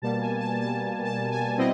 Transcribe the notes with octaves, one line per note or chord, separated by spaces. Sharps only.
B2 G3 A#3 A5
G#5
A5
A5
A5
G#5
B2 G3 C4 E4 D#5